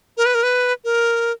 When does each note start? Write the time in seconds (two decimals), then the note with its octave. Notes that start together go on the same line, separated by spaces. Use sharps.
0.17 A#4
0.26 B4
0.35 A#4
0.43 B4
0.85 A#4